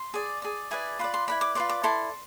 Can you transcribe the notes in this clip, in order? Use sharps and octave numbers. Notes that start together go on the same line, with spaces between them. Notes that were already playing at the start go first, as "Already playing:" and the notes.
Already playing: C6
G#4 D5
G#4 D5
E4 G#4 B4 D5
F4 B4 D5 B5
C6
E4 B4 D5 B5
D6
F4 B4 D5 C6
D6
E4 A4 D5 C6